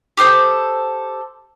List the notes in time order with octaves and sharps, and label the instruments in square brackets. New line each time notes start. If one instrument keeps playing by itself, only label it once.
[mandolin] G4 A4 C5 D#6